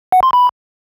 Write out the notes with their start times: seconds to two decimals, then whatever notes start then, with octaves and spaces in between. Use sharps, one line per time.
0.12 F#5
0.23 C6
0.33 B5